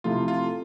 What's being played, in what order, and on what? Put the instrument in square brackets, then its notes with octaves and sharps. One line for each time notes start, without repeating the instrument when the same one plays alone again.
[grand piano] C3 F3 A3 E4 [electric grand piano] F4
[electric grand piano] F4